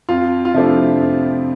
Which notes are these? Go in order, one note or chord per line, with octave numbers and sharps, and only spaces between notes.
F2 F4
F4
C3 F3 A3 D4 E4
F2